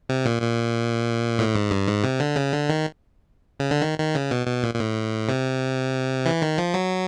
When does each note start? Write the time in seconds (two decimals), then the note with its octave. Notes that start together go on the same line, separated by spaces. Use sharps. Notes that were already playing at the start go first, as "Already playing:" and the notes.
0.09 C3
0.25 A#2
0.42 A#2
1.38 A2
1.55 G#2
1.71 G2
1.88 G#2
2.04 C3
2.20 D3
2.36 C#3
2.53 D3
2.69 D#3
3.60 C#3
3.71 D3
3.82 D#3
3.99 D#3
4.15 C#3
4.31 B2
4.47 B2
4.63 A#2
4.74 A#2
4.80 A2
5.29 C3
6.25 E3
6.42 D#3
6.58 F3
6.74 F#3